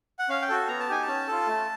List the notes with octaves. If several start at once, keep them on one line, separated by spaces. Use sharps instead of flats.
F#5
C#4 F5
G5
F#4 A4
B3 A#5
A5
D#4 G4 G#5
A5
C#4
F4 A4
A3